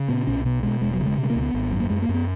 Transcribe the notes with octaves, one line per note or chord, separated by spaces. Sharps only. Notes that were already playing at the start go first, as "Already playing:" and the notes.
Already playing: C#3
A#2 B3
B1 C#4
B2 B3
B2 G#3
E1 G#3
F#3
C#3
G#3
B2
G#3
A#3
C#2
B3
G#1
F#2
A#3
F#2 G#3
A#3
F#2
B3